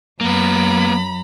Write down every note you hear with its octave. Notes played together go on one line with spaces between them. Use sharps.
F#2 A#3 B3 A#5 B5